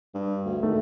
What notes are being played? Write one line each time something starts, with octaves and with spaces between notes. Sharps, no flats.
G2
D2
D#3 A3